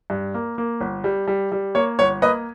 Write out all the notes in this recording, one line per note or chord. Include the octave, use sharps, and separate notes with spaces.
G2
A#3
A#3
G1
G3
G3
G3
A#3 C#5
G1 C#5
A#3 B4 D#5